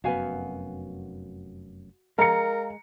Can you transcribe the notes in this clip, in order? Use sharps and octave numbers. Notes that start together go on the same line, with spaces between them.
F1 F#2 B3 F#4 F5 G#5
G#3 A#4 F5 A#5 C#7